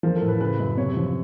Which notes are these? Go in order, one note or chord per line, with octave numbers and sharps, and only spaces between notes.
F3 A#4
A4
A2
B4
C#3 B4
F#2
C3 C#5
F3